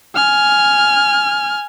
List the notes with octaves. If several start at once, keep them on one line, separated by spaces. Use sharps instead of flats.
G#5 F6